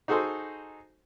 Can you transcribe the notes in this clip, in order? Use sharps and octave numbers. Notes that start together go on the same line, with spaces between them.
D#4 F#4 G#4 A4 C5